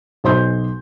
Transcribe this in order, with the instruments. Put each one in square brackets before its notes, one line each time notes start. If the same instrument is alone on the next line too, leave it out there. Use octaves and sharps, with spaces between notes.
[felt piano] B1 C5 C6 G6